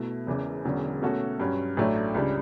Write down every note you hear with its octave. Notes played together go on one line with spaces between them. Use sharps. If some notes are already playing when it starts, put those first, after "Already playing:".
Already playing: B2 A3 E4
E1 E2 C#3 E3
E1 E2 D3 F#3 C#4
B2 A3 C#4 F#4 A4
G2 F#3 C#4
A1 A2 F#3 A3 D4
C#2 C#3 G3 D4